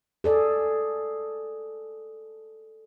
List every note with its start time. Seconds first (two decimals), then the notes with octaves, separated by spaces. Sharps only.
0.24 G#4 A4 D5